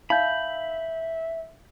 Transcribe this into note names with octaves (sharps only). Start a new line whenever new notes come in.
D#4 E5 F5 B5 G6